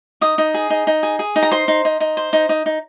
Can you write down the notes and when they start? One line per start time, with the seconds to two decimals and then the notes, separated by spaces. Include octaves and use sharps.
0.21 D#4 D#6
0.38 D#4
0.54 G#4
0.70 D#4
0.87 D#4
1.03 G#4
1.19 G#4
1.36 D#4
1.43 A#5
1.52 C5 C6
1.68 D#4
1.85 D#4
2.00 D#4
2.17 C5
2.33 D#4
2.49 D#4
2.66 D#4